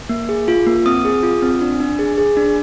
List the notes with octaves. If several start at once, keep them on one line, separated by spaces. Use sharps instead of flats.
A#3
G#4
F4
A#3
C4 D#6
G#4
F4
C4
D4
D4
G#4
G#4
D4